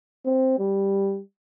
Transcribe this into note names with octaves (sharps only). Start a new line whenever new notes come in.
C4
G3